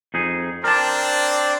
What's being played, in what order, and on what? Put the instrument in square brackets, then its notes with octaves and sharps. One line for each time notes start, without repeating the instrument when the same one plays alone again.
[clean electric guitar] F2 D#4 G#4
[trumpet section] C4 D4 D5 [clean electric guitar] A#4 A5